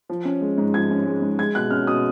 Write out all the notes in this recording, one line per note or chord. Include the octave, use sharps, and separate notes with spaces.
F3
C#4
G#3
G#2
F3 G#6
C#4
G#3
G#2
G#3 G#6
B2 F#6
C#4 F6
B2 D#6